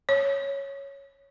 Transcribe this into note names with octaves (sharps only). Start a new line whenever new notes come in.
C#5